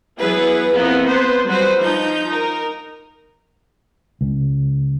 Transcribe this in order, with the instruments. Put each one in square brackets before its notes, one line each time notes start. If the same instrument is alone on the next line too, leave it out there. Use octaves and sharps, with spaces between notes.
[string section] F#3 B3 E4 G#4 B4
F2 A#3 B3 E4
B3 B4 C5
F#3 G3 F#4 B4 C5
F3 D#4 G6
D#4 A#4
[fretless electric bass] C#2